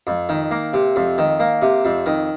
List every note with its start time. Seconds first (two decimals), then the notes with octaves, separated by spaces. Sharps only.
0.07 F2
0.29 D#3
0.51 A#3
0.73 C3
0.96 F2
1.18 D#3
1.40 A#3
1.62 C3
1.85 F2
2.06 D#3